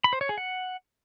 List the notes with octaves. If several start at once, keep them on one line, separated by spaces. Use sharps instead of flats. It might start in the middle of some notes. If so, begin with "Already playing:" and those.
B5
C5
C#5
G#4
F#5